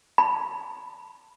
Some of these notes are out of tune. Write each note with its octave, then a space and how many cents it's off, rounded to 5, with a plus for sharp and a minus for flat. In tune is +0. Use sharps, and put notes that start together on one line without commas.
B5 +5